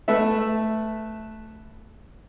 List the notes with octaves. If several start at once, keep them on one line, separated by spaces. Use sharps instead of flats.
A3 B4 E5